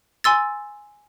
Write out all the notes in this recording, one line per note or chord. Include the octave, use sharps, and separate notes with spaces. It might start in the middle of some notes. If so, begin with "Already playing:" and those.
G#5 C6 E6 A6